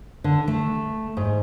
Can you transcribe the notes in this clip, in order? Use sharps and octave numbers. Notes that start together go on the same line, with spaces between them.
D3
A3
G#2